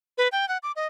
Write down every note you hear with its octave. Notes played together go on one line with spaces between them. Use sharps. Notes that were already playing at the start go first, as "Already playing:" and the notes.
B4
G5
F#5
D6
D#5